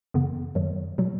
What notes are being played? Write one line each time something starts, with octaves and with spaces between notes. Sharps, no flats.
F#2 C#3 E3 B3
F#2 D#3 F#3
B2 F#3